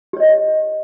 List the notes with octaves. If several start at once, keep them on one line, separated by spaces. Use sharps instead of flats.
G4 C#5 D#5